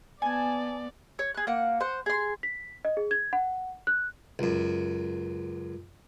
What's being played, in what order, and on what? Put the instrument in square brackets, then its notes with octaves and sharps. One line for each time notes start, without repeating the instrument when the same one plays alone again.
[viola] B3 D5 [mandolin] G#5 A5
[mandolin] C#5
G#4 F#6
A#3 F#5
C5 F#5
G#4 C6
[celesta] B6
D#5
G#4
G#6
F#5
F#6
[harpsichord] C#2 F#2